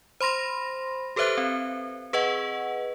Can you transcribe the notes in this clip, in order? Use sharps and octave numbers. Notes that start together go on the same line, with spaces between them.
C5 B5 C6 A#6
G4 A4 B4 C5 E5 F#6
C4
G#4 B4 D#5 F#5